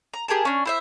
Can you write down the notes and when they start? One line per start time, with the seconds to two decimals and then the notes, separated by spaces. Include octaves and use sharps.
0.14 A#5
0.28 G4 G#4 A#4 A5
0.45 C#4 D4
0.66 E4 C5 E5